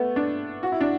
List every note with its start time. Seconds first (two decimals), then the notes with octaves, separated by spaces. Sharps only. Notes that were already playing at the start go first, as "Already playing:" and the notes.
Already playing: A3 B3
0.16 D4
0.63 F#4
0.72 E4
0.81 D4